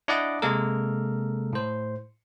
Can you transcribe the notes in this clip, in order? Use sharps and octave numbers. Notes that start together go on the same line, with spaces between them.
D4 E4 D5 D#5 F#5 D6
C3 G#3 A#3 A4 A#4
A2 C5